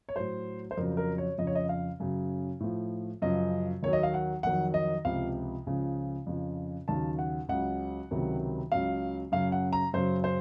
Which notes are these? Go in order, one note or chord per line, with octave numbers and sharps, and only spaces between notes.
C#5
A2 F#3 C5
C5
F2 C#3 F#3 A#4
A#4
C#5
F2 C#3 F3 D#5
C#5
D#5
F5
F#2 C#3 F#3
A2 F3
F#2 C#3 F3 D#5
D#2 D#3 F#3 C#5
D#5
F5
F#5
F2 D#3 F#3 F#5
D#5
C#2 C3 F3 F5
C#2 C#3 F3
F2 C#3 F3
D#2 C#3 F#3 A5
F#5
C#2 C#3 F#3 F#5
C#2 C3 D#3 F#3
C#2 C#3 F#3 F5
F#2 C#3 F#3 F5
F#5
A#5
F#2 C#3 F#3 C5
C5